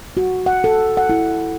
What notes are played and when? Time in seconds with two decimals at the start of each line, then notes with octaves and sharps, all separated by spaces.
0.17 F#4
0.46 F#5
0.64 A4
0.97 F#5
1.09 E4